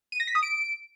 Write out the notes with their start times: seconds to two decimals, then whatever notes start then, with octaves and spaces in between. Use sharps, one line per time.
0.12 D#7
0.20 A#6
0.27 B6
0.35 D#6
0.43 D7